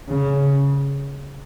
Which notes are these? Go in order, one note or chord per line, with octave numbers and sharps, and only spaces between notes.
C#3